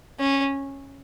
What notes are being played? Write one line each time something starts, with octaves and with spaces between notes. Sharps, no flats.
C#4